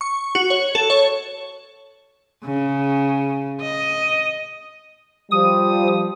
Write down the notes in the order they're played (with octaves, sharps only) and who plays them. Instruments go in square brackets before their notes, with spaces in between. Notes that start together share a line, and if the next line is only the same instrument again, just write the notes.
[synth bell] C#6
F#4
C#5
A4
C#5
[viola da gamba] C#3
D#5
[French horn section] F3 G3 [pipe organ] D#6